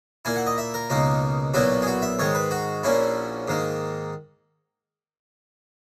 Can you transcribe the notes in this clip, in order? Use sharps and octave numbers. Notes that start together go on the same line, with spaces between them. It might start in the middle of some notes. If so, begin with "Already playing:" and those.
A#2 A#3 E4 G#5
F#5
D#5
E5
A#4
C#2 B2 A#3 D#4
B1 A#2 F#3 B3 E4 F#4
G#4
F#4
E5
G#2 D#3 G#3 C#5
B4
F#4
A#1 A#2 A#3 C#4 E4
G#2 D#3 A#3